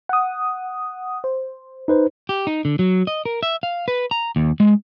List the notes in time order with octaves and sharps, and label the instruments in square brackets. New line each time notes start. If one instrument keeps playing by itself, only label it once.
[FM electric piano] F#5 D#6
C5
[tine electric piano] D#4 B4 C5
[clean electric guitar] G4
D#4
D3
F#3
D#5
A#4
E5
F5
B4
A#5
D#2
G#3